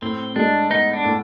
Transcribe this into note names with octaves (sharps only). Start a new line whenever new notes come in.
A2 C4
G#3 D4
B3 D#4
D4
A2